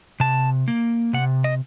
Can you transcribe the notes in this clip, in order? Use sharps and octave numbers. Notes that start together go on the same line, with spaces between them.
C3 A5
A#3
C3 F#5
D#5